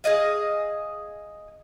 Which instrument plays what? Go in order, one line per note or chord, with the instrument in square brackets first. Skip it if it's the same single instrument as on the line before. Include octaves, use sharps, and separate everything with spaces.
[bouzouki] G#4 B4 D#5 F5